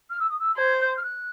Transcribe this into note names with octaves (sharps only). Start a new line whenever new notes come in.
F6
E6
D#6
E6
C5 G#6
G6
F6
F#6